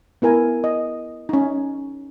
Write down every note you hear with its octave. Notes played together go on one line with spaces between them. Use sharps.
B3 E4 A#4 G#5
D#5
C#4 D#4